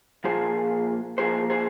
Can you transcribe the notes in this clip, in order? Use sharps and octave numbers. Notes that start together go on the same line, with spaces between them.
A#2 F3 A#3 G#4 C5
A#2 F3 A#3 G#4 C5
G#4 C5